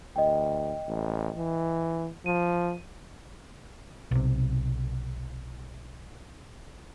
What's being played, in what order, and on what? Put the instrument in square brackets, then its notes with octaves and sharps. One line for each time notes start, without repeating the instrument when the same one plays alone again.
[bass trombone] D2 [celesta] D#5 G5
[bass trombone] A1
E3
[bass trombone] F3 [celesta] D#7
[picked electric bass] B1 C3